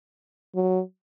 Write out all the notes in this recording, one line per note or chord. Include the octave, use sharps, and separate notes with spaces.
F#3